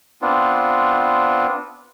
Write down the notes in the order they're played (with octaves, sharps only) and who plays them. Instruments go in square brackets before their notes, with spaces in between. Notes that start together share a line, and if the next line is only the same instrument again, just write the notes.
[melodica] B3 C4 D4 F4